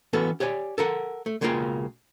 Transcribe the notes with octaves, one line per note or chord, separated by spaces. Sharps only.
E3 B3 C#4 F#4 A4
G4 C#5 D5 F#5 G#5
A4 A#4 F#5
A3
B1 C#3 G#3 A#3 F4 G5